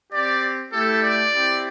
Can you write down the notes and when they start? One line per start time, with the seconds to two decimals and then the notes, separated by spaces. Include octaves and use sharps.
0.12 C4 G4 D5
0.72 A3 E4 G4 A4
1.02 D5
1.33 C4 E4 G4